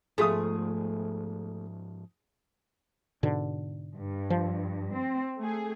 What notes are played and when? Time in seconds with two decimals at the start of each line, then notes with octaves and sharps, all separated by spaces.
0.18 G#2 F3 A3 F4 G#4 D#6
3.23 G#2 B2 D3
3.96 G2
4.30 F3
4.93 C4
5.38 A3 G#4